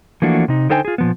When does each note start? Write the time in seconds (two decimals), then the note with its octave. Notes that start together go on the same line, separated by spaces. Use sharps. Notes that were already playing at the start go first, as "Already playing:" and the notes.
0.22 E3 F3 A3 A#3 D4 F#4
0.48 C3 D#4
0.70 D3 D#4 A4 C5 G5 G#5
0.85 F4 G#4
0.98 A#2 F3 B3